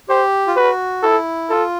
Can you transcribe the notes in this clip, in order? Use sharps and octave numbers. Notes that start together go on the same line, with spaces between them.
G4 C5
F4
F#4 B4
E4 A4
F4 A4